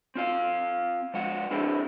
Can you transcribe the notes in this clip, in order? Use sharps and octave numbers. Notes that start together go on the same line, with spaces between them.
C4 F4 F5
F3 G#3 F#5
C4 D4 E4 G#4 C5 E5